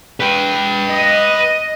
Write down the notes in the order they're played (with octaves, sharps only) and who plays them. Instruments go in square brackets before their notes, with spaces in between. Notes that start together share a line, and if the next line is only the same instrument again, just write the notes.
[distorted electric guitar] B4 G5
[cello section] D#5